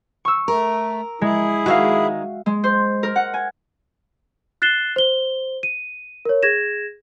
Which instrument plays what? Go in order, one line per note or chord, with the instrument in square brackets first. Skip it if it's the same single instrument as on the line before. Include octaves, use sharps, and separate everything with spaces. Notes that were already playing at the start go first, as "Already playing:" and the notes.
[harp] C#6 E6
[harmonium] A3 [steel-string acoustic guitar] A#4
[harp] G#3 [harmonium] E4 G#4
[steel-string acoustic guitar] D#3 G#3 [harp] F#4 E5 F5
[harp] G#3
C5
A#4
F#5
G#5
[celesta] F#6 A6 C7 E7 G7
C5 G7
D#7
A#4 C#5
G#4 G#6 A#6 E7